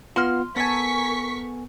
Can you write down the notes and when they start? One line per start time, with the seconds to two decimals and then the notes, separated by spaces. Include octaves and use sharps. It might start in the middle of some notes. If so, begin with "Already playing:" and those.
0.16 B3 F4 C6 F6
0.57 B3 A4 A#4 G#5 C#6 B6